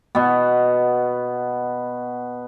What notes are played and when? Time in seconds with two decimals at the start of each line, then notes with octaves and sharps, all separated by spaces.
0.15 B2 B3